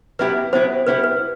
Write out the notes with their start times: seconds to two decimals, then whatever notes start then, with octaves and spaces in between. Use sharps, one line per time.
0.19 F#3 B3 E4 G4 B4
0.53 F#3 B3 E4 G4 C5
0.87 F#3 B3 E4 G4 B4
1.04 B4